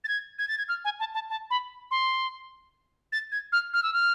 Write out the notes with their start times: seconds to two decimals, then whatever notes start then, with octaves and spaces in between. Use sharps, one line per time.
0.04 A6
0.08 G#6
0.38 G#6
0.48 A6
0.58 G#6
0.69 F6
0.84 G#5
1.00 A5
1.14 A5
1.29 A5
1.50 B5
1.91 C6
3.12 A6
3.32 G#6
3.52 F6
3.73 F6
3.83 E6
3.93 F6